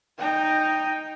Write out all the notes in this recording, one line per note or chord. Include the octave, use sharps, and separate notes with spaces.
D#4 G5